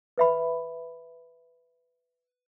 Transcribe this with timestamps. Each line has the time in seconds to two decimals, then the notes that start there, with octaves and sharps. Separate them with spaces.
0.18 B4 E5 B5